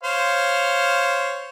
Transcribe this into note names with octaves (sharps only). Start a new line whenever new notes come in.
C5 C#5 F5